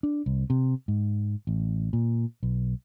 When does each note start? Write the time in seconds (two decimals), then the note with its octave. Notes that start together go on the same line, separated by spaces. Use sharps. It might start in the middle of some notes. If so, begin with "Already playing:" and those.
0.03 D4
0.26 C2
0.50 C3
0.88 G#2
1.47 A1
1.93 A#2
2.43 B1